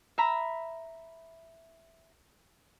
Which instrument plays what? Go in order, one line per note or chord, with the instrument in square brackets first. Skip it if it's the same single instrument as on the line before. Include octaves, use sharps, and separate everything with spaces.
[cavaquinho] E5 A#5 B5